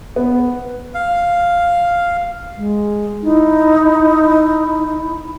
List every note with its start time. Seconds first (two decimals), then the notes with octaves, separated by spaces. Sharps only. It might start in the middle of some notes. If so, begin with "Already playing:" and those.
0.16 B3
0.94 F5
2.57 G#3
3.23 D#4 E4